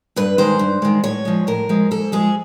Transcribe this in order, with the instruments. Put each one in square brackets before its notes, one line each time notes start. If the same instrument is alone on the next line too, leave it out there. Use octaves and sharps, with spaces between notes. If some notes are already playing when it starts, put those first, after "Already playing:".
[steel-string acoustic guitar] G2 B4
D#3 G#3 C5
G2
D#3 G#3
A2 C#5
F3 G#3
A2 A#4
F3 G#3
G#2 A4
F3 G#3 G#4